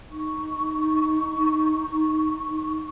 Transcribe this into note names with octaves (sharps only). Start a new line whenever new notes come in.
D#4 C#6